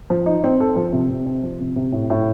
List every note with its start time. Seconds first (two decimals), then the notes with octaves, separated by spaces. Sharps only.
0.10 F3
0.26 D#4
0.44 C4
0.60 A4
0.76 F3
0.93 C3
1.10 C3
1.26 C4
1.43 F3
1.60 C3
1.76 C3
1.92 A2
2.10 A2